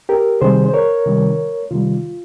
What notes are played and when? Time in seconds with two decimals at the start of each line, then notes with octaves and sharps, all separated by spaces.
0.09 G4 A#4
0.41 C3 D#3 G3 G#4 C5
0.66 C5
0.74 A#4 C#5
1.06 C3 D#3 G3
1.71 C3 D#3 G3 F4